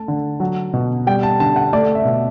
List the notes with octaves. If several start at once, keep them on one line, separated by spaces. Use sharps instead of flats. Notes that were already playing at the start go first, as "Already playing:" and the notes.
Already playing: A3 A5
D3
F#3
B2
G3 G5
A5
D3 A5
F#5
A3 D5
E5
B2